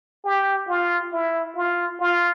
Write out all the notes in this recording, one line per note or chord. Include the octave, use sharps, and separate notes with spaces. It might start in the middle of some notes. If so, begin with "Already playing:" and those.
G4
F4
E4
F4
F4